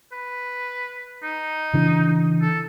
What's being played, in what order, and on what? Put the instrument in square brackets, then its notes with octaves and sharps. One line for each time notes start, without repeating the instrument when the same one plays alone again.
[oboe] B4
D#4
[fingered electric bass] C#3 E3 D4
[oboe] A4